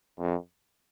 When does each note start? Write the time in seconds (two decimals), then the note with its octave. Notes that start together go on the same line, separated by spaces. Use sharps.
0.20 F2